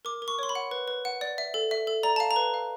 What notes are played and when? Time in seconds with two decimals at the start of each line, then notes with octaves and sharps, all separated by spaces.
0.05 A#4 D6
0.22 A#4
0.28 C#6
0.39 C#5 C6
0.49 B5
0.55 F#5
0.71 B4
0.88 B4
1.05 F#5
1.21 D5
1.38 E5
1.54 A4
1.71 E5
1.87 A4
2.03 D5 A#5
2.16 F5 A5
2.31 A#5
2.36 B4
2.54 F5